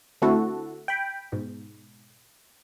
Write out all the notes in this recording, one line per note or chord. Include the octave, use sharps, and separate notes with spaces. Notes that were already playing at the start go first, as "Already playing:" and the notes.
D3 A3 C4 E4 F#4 A4
G5 B5
G#2 B2